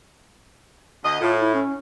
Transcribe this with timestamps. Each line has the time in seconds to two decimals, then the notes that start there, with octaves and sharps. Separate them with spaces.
1.05 D2 D#5
1.21 A2 F4
1.39 E4
1.54 C#4